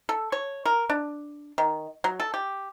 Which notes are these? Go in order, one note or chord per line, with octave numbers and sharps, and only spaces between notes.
A4
C#5
A#4
D4
D#3
F#3
A4
G4